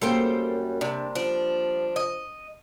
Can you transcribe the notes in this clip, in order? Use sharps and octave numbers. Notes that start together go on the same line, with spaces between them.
F#2 G3 A#3 C4 A4 C5 G5
C3 D4
F3 D4
D#5